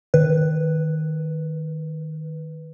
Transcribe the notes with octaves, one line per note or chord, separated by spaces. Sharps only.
D#3 B4